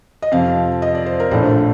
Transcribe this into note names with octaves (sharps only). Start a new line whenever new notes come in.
D#5
F2 C3 F3 F5
D#5
D5
C5
A#4
A#1 A2 A3 D4 C5